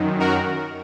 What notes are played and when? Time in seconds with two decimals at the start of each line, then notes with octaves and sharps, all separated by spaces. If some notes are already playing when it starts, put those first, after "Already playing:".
Already playing: F#2 D#3
0.20 F#4 A#4